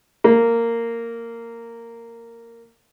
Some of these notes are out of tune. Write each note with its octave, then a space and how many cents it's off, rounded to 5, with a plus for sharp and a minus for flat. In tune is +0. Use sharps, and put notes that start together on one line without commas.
A#3 -10